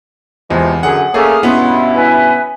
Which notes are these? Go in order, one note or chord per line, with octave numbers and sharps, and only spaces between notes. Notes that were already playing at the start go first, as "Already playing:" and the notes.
E2 C3 F3 G#3
F#2 D3 G#4 F#5
A3 A#3 C#4 G#4 D6 D#6 F6
G2 B2 B3 C#4 E4 C6
B4 E5 G#5